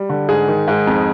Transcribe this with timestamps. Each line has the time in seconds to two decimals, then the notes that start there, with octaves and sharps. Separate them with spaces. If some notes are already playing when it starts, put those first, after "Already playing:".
Already playing: G3
0.09 D3
0.29 G#2 G#4
0.48 D#3
0.68 G#2
0.87 F2